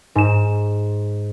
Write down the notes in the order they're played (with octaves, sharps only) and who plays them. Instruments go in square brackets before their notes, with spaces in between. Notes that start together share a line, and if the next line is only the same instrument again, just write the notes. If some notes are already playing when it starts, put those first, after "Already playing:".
[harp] G#2 E7